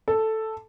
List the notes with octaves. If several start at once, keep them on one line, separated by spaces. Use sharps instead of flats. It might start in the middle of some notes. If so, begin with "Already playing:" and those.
A4